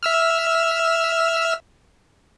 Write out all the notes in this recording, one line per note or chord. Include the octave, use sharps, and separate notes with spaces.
E5 E6 F6